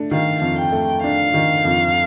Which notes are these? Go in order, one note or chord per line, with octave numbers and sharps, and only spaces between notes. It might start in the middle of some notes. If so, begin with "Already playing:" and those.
Already playing: A3 D4
D#3 F5
F2
G5
A3
D4 F5
D#3
F2